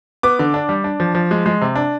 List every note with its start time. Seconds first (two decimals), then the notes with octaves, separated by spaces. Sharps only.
0.23 B3 D6
0.39 D3
0.54 D4
0.69 G3
0.84 D4
1.00 F3
1.15 F3
1.31 G#3
1.46 G#3
1.61 C3
1.76 D4